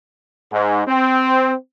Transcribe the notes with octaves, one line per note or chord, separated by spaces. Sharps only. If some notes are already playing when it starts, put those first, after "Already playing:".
G#2
C4